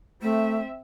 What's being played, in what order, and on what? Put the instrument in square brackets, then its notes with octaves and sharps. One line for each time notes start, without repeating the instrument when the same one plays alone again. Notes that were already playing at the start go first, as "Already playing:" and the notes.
[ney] A3 [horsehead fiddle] C4 E5